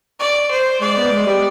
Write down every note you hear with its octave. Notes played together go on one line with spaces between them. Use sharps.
D5
C5
G#3 D5
B3
G#3
G3